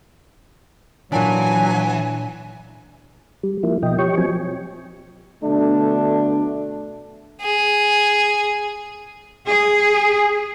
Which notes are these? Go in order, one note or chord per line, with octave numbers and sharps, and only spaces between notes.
A#2 E3 F#3 D4 G#5
G3
F3 A#3 E4
B2 F3 D#5 G5
G4 C#5 G5 C#6
F3 F#3 C4 G#5
B2 D3 A3 D4
G#4
G#4